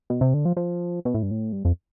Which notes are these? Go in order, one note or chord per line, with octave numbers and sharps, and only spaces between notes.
B2
C3
D3
F3
F3
B2
A2
G2
A2
G2
F2